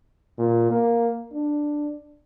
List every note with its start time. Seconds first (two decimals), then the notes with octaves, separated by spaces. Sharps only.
0.38 A#2
0.71 A#3
1.33 D4